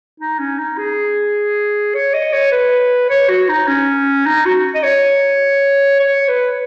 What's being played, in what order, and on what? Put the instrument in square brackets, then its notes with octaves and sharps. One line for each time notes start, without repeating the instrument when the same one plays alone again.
[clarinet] D#4
C#4
D#4
G#4
C#5
D#5
C#5
B4
C#5
F#4
D#4
C#4
D#4
F#4
D#5
C#5
C#5
B4